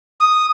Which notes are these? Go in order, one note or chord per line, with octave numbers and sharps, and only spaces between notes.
D#6